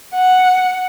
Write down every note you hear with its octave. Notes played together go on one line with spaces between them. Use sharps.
F#5